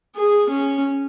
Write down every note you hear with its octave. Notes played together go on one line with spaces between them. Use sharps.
G#4
C#4